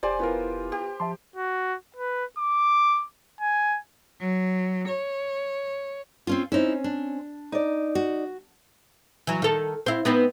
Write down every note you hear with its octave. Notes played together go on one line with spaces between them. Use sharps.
F1 G4 C5 D5 G#5
B3 E4 F4 A#4
G4
F3 E5 A5 C6
F#4
B4
D6
G#5
F#3
C#5
C4 C#4 F4
C4 C#4 D#4 E4
D4
D#4 D5
F#4
E3 F#3
D#3 A4
C4 E4
B3 C4 D#4